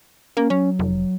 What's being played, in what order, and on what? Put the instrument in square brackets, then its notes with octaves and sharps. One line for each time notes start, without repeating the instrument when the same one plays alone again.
[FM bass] A#3 [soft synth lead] C#4
[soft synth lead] F#3 [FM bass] C#4
[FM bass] F1